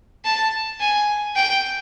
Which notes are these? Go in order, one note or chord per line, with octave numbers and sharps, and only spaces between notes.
A5
G#5
G5